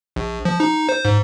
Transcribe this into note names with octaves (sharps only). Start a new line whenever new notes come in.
A#1
F3
D#4
C5
G#2